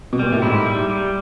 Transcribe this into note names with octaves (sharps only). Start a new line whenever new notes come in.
B2
A#2 G3
A2
G#2 E4
G3
G3